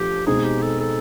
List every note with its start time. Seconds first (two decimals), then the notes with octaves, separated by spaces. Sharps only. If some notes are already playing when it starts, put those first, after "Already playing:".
Already playing: F3 A3 D4 G4
0.26 B2 G#3 C4 D#4 G#4
0.44 G4
0.62 A4
0.80 A4